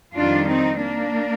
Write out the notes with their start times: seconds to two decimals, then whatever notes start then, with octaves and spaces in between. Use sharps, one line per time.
0.15 F2 D#3 G3 D4 F4
0.48 C4 D#4
0.81 A#3 D4